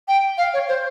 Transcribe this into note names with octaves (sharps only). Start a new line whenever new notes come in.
G5
F5
C#5
C5